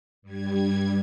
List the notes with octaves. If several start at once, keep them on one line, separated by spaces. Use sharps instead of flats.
G2 G3 G#6